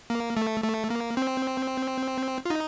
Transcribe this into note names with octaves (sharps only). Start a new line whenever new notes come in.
A#3
A3
A3
A#3
C4
F4
D#4